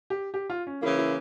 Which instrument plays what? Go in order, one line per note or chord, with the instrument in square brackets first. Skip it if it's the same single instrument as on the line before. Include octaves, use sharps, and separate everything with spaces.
[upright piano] G4
G4
F4
C#4
[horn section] C#3 E3 A#3 [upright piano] E4
[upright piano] E4